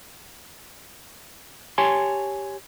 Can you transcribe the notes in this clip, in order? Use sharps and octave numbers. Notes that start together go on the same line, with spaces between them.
G4 C#5 G#5 A5 C6